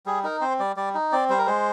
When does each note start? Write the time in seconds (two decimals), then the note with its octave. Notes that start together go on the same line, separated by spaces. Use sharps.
0.06 G3 G#4
0.24 D#4 A#4
0.41 C4 C5
0.59 G3 D5
0.76 G3 D5
0.94 D#4
1.12 C4 D5
1.29 G3 C5
1.38 A#4
1.46 G#3 C5